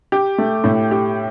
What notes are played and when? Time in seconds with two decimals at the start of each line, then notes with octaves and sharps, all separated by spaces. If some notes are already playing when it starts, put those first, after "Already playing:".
0.12 G4
0.38 A3
0.64 A2
0.91 G4